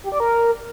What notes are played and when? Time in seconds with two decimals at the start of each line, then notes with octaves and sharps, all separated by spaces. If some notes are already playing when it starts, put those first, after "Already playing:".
0.04 G4
0.12 D5
0.20 A#4